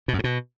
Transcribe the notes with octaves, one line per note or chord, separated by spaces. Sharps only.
B2
F#2
G#2
B2